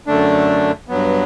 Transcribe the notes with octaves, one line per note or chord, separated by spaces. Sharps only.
F#2 D3 A3 D4
G2 F#3 B3